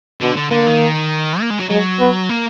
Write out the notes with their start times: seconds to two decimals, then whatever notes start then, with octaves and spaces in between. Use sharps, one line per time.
0.21 B2 D3
0.36 D3
0.50 D3 A#3
0.66 D#3
1.40 A#3
1.50 G#3
1.60 F#3
1.70 F#3 G#3
2.00 B3
2.29 A#3